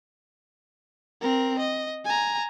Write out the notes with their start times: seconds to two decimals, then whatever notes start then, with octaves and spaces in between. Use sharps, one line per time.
1.21 C4 A#4
1.59 D#5
2.05 G#5 A#5